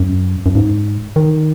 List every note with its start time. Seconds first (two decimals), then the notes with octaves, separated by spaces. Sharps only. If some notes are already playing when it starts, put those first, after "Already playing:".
Already playing: F#2
0.46 F#2
0.55 G#2
1.16 D#3